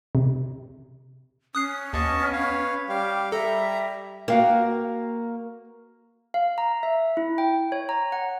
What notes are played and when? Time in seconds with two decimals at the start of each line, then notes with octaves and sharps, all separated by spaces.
0.15 C3
1.55 C#4 D#6 F#6 C7
1.93 D#2 B3 D#5 A5 C#6
2.32 B4 C#5 F5
2.89 G3 G4 F5
3.32 G3 A4 E5 A#5
4.28 A#3 F#4 F5 G5
6.34 F5
6.58 A#5
6.83 E5
7.17 E4
7.38 G5
7.72 C#5
7.89 A#5
8.12 F#5